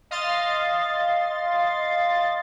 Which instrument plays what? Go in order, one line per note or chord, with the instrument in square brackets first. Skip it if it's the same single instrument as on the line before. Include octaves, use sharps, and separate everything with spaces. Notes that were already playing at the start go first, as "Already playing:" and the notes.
[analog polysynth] D#5 F5 C6 A6